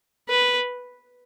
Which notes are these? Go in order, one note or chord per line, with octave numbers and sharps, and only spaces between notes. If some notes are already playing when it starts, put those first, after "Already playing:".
B4